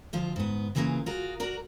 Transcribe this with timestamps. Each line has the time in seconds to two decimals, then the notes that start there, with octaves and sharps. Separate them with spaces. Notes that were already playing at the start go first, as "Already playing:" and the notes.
0.13 D2 F3 F4
0.36 G#2 B3
0.75 C#3 E3 G3 A#3 F4 G#4
1.06 F4 F#4 G#4 A#4
1.40 F#4 A#4 D5